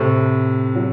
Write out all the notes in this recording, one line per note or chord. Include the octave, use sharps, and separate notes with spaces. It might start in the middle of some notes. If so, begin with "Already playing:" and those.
Already playing: A2 C3 A4 C5
D3 F#3